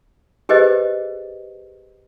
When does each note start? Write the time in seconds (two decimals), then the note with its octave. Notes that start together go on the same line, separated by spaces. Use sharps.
0.49 G4 G#4 B4 C5 D#5